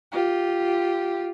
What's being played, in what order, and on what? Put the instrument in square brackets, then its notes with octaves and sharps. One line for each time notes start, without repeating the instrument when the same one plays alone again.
[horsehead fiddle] F4 G4